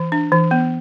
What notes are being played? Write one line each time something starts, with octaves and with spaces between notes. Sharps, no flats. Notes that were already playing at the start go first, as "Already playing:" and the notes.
Already playing: E3
D4
E3
B3